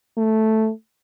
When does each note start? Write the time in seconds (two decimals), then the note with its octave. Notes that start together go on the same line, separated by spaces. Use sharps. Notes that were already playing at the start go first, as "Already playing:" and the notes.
0.17 A3